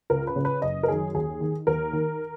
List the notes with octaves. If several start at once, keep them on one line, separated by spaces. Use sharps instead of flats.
C#2 A#4
B4
C#3
B4
F#1 D#5
A#4
F#2 D#3 G#4
D#2 G#4
D#3
D#2 A#4
D#3